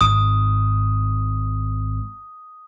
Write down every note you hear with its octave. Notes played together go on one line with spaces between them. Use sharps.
G#1 G#2 D#6